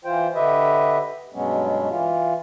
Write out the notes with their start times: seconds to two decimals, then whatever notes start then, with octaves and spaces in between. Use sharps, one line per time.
0.05 E3 F4 C5 G5
0.35 D3 G4 B4 D#5 E5
1.34 G2 B2 F#3 G#3 B3 C#4
1.89 E3 F4